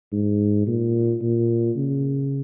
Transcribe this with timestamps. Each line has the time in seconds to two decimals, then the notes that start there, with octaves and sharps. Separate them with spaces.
0.13 G#2
0.67 A#2
1.22 A#2
1.77 C#3